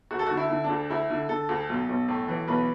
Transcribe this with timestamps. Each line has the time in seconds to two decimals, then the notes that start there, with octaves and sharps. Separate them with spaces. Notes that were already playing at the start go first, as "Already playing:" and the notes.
0.11 D2 F#4
0.19 A4
0.27 F#4
0.31 D3
0.37 E4
0.50 D3
0.64 D4
0.70 D2
0.90 D2 E4
1.10 D3
1.29 D3 A4
1.49 D2
1.69 B1
1.89 B1
2.08 A2
2.28 E3
2.48 B1 B4